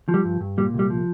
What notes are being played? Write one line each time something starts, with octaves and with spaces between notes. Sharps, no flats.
F3
G3
G2
G2
A#2 G3
C2
G3
F3